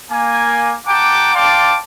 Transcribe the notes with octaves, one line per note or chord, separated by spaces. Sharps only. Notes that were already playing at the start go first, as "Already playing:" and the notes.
A#3 G#5
F#5 G5 A5 A#5 D6
D5 F5 G5 A5 C6 D6